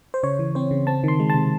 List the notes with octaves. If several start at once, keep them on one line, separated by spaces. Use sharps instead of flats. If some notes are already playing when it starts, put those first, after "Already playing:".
C5
C#3 C#5
E3
C4 C5
C#3
C4 A5
D#3 C6
G#3
C3 A5